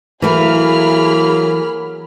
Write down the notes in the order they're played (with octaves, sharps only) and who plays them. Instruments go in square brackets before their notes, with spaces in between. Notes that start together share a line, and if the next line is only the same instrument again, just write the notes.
[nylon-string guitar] E3 A3 E4 [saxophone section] F#3 A#3 [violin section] G#4 B5 F6